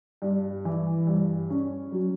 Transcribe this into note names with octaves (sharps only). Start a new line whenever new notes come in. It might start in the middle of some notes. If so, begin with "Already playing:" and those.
G2
E3
G2
C#4
F#3